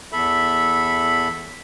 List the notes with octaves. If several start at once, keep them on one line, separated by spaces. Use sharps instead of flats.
E2 A4 E5 B5